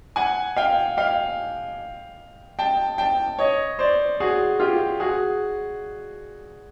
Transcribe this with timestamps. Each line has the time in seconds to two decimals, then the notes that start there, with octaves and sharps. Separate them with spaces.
0.16 F#5 G#5
0.57 F5 G5
0.97 F5 G5
2.59 G5 A5
2.98 G5 A5
3.39 C#5 D#5
3.79 C5 D5
4.20 F#4 G#4
4.60 F4 G4
5.00 F#4 G#4